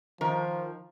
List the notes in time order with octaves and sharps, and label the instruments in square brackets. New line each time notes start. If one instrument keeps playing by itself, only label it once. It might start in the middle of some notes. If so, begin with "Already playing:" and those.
[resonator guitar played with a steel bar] D#3 A#4 [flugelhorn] F3